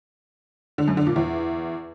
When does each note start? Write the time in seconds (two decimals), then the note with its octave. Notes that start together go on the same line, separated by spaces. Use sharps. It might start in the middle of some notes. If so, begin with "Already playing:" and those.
0.78 D3
0.88 F#2
0.97 D3
1.07 A#2
1.16 E2